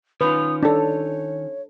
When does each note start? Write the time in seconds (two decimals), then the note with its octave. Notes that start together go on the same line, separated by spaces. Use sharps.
0.21 D#3 C#4 F4 B4 D#6
0.63 D4 A4 C#5